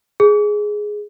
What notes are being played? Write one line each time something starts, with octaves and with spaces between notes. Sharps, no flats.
G#4